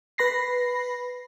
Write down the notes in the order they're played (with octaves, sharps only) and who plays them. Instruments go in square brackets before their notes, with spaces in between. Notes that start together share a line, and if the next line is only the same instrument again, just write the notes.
[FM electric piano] B4 B5 A#6 C7